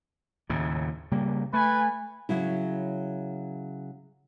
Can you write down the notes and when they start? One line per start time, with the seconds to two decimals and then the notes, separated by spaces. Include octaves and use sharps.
0.50 D#2 A2 C#3
1.12 C#3 G3 A#3
1.53 A3 B4 G#5
2.29 C#3 F#3 E4